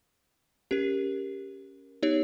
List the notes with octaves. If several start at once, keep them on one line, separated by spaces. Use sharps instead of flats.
C#4 G4 A#4
B3 D#4 G4 C#5